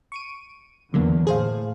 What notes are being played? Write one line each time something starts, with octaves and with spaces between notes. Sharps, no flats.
C#6 D7 D#7
E2 D3 F#3 A#3
A2 G#4 C5 F5